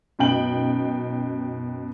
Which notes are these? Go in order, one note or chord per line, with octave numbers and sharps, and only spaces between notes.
F#2 B2 D#4 G5 F#7